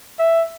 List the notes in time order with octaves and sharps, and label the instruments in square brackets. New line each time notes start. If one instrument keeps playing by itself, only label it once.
[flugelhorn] E5